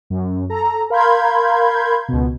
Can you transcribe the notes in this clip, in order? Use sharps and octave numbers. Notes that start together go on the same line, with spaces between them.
F#2
A4 A#5
A#4 F5 B5 C6 G6 G#6
C#2 B2